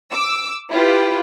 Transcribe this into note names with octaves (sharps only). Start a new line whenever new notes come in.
D6 E6
E4 F4 G4 B4